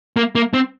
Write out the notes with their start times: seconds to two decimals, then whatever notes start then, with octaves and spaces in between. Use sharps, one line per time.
0.16 A#3
0.35 A#3
0.54 C4